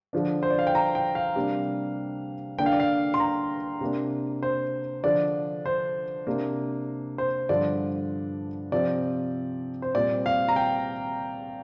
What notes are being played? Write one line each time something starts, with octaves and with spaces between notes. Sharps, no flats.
D3 F3 D4
C5
D5
F5
G5
A#5
G5
F5
C3 G3 A#3 D4
D3 A#3 D4 G5
F5
D5
F5
C6
A#5
C3 A#3 D4
C5
D3 F3 D4 D5
C5
C3 A#3 D4
C5
G2 D3 F3 D4 D5
C3 F3 C4 D5
C5
A#2 G3 C4 D5
F5
A#5
G5